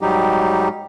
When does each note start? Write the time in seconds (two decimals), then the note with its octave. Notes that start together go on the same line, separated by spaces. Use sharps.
0.01 G#2 F#3 G3 D#4 G4